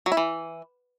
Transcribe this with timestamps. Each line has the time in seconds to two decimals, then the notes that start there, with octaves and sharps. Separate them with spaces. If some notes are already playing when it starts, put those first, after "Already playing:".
0.06 F#3
0.12 E4
0.17 E3